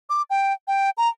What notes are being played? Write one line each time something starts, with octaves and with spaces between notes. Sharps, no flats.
D6
G5
G5
A#5